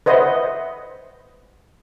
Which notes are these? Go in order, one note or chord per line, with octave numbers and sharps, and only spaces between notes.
B4 C5 D#5 E5 F#5